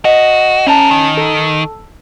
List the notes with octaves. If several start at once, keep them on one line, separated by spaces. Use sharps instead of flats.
F#4 D#5
C#4 E4 A#4 A5
D#3
A4